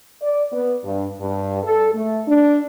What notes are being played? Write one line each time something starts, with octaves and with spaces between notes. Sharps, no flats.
D5
B3
G2
G2
A4
A3
D4